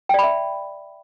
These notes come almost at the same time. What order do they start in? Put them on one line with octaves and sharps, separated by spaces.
G5 D5 B5 E5